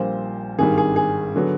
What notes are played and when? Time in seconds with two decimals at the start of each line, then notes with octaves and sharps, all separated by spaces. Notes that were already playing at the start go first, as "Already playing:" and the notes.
Already playing: A#1 A#2 G3 C5
0.59 G#1 G2 D#3 G3 G#4
0.78 G#4
0.96 G#4
1.36 D3 F#3 B3